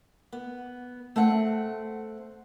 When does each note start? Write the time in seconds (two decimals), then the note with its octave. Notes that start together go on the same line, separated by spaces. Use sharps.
0.32 B3
1.16 A3 C4 F#5